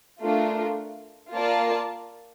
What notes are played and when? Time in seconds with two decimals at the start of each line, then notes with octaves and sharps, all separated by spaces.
0.21 A3 D4 F4 A#4
1.33 A#3 F4 A#4 D5 A5